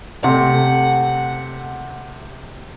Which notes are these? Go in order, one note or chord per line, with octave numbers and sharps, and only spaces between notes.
C3 A3 F#5